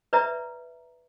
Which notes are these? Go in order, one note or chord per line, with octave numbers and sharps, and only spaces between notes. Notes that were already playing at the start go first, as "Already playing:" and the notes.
B4 D5 E5 A#5